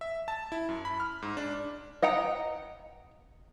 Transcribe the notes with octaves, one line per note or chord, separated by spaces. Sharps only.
E5
A5
E4
F#2
B5
F6
G#2
D4
D#5 F#5 G5 A#5